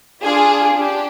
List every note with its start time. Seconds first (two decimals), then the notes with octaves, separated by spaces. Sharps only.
0.22 D4 F4 G#4
0.75 D4 G4